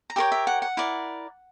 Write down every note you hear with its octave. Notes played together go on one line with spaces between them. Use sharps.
A#5
G4 A#4 C#5 E5 G5
E5
F#5
F#5
E4 A#4 D5